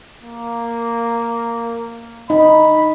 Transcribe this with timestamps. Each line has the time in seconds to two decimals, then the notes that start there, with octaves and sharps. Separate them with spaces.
0.21 A#3
2.30 D#4 B5